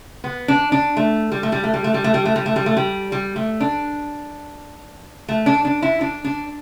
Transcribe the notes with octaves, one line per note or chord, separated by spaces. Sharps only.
B3
D4
D4
A3
G3
A3
G3
A3
G3
A3
G3
A3
G3
A3
G3
A3
G3
A3
G3
G3
A3
D4
A3
D4
D4
E4
D4
D4